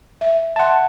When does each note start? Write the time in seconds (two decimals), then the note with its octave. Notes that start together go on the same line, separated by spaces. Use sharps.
0.21 E5
0.56 E5 F#5 A5 C6